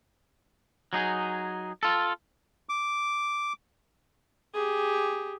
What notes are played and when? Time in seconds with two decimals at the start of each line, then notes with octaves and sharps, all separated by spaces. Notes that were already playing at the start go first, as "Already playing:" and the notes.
0.93 F#3 D#4 G#4
1.83 F4 A4
2.69 D6
4.54 G4 G#4